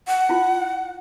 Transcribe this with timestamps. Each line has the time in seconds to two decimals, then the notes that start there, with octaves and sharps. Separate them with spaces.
0.07 F#5
0.29 E4 F4